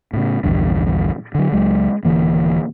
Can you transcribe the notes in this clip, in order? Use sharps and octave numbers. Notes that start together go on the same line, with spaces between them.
A2 C#3
A#1 E2 G2 D3
D3 F#3
C#2 F#3 G#3
D#1 D3 E3 A#3